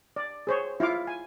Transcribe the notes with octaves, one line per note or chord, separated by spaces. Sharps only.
D5
G#4 C5 C#5
E4 F4 F5 D6
G#5